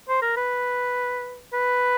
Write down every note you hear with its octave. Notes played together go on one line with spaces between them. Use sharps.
C5
A#4
B4
B4